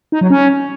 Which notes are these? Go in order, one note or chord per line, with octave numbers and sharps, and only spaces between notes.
D#4
F#3
C#4